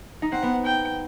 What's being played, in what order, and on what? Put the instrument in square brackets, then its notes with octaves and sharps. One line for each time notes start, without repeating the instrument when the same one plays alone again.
[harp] D#4
[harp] C4 [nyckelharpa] F#5
[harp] B3
[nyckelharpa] G5